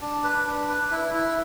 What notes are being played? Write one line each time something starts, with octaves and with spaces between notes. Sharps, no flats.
D4
B4
D4
B4
E4
E4